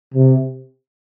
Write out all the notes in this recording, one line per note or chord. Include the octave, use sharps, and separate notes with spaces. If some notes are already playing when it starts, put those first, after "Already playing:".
C3